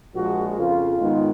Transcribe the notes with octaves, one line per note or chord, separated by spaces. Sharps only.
A#1 A#2 F3 G#3 F#4
F2 C#3 F3 F4
G#2 D#3 G#3 B3